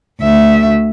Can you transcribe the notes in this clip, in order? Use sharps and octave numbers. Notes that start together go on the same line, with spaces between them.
D2 E5